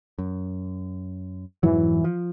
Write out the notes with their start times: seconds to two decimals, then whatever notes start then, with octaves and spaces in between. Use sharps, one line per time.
0.18 F#2
1.63 F2 G#2 E3 F#3
2.04 F3